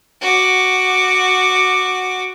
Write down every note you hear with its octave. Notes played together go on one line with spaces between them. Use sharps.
F#4 D6